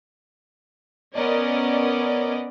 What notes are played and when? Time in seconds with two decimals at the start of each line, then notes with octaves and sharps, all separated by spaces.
1.15 B3 C#4 A#4 D5 D#5